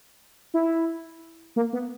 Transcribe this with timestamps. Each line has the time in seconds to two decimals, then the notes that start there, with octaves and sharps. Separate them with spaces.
0.54 E4
1.56 A#3
1.73 B3